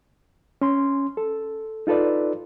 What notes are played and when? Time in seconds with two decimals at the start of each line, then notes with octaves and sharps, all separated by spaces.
0.62 C#4 C6
1.17 A4
1.87 D#4 F4 A4 B4 D5